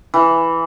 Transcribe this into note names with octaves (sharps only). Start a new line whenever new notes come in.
E3